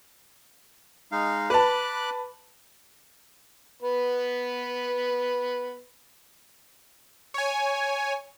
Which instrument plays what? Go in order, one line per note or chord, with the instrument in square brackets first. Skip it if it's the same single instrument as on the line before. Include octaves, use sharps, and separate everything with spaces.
[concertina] G#3 D#4 F5
[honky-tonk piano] B4 A5 [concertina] B5 D6 F#6
[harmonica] B3 B4
[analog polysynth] C#5 G#5